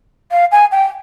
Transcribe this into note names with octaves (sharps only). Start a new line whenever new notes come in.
F5
G#5
G5